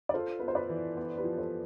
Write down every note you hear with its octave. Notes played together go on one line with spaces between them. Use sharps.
D5
F4 A4 C5
B3 B4
C5
B4 D5
E3
B3
G4 B4
F3
A4 C5